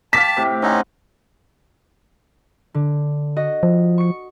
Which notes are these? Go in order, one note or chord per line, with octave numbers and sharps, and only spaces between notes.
F5 G5 A5 D6 B6
A2 C3 G4
C4 C#4 D#4 F#5 C6
D3
F#4 D#5
F3
C#6 C#7